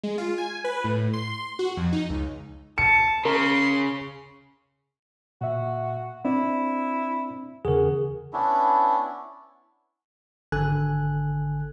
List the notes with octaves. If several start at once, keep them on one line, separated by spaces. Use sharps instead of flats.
G#3
F4
G#5
B4
A2
C6
F#4
F2
D#4
C#2
A5 C#7
C#3 A#4 C6
A#2 F#4 E5
C4 D4 E4 D5
E2 C#3 F#4 G#4 A#4
B3 C#4 D4 E4
G#1 D3 A4 G#5 F#6